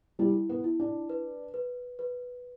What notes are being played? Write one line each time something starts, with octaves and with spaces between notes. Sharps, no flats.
G3 E4
B3
E4
D4
B4
B4
B4